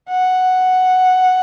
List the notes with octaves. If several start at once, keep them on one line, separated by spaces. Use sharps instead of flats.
F#5